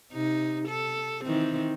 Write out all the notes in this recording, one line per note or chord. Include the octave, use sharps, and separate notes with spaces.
C3 D#4
A4
D#3 E3 C4